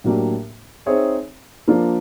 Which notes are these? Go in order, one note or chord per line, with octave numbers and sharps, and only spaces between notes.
A2 F#3 A#3 D4 G4
C4 D#4 G#4 C#5 E5
F3 A#3 D4 F4 A#4